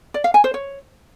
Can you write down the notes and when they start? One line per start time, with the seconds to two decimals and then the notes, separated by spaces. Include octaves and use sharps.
0.14 D5
0.24 F5
0.34 G#5
0.44 C5
0.54 C#5